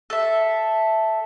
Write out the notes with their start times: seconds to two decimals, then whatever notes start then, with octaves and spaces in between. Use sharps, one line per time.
0.10 A4 E5